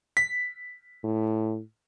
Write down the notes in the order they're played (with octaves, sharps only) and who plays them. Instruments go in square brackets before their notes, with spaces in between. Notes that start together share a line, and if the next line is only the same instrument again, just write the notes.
[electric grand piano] B6
[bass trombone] A2